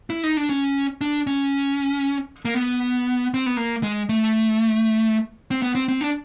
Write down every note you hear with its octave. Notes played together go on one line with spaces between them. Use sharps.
E4
D#4
D4
C#4
D4
C#4
A#3
B3
C4
B3
A#3
G#3
A3
C4
B3
C4
C4
D4